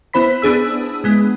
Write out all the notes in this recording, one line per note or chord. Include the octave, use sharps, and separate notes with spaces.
B3 E4 C5 B5 B6
B3 D4 G#4 E6
G#3 B3